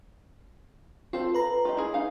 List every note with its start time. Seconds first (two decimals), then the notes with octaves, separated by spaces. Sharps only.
1.13 C4 F4 A4 C5
1.34 B4 A#5
1.65 F4 G4 D#5
1.77 E4 G#4
1.94 D#4 F5